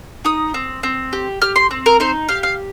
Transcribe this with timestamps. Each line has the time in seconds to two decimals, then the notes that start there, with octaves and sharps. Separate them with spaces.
0.25 D#4 D#6
0.54 C4
0.83 C4
1.13 G4
1.42 G4 F6
1.56 C6
1.71 C4
1.86 A#4
2.00 D#4 C5
2.29 G4 F5
2.43 F5